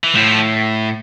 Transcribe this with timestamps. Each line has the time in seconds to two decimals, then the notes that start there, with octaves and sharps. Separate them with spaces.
0.04 E3
0.15 A2 F3